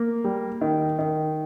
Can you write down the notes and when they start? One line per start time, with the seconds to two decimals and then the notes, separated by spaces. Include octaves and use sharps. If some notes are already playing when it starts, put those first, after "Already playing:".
Already playing: A#3
0.24 G3
0.61 D#3
0.99 D#3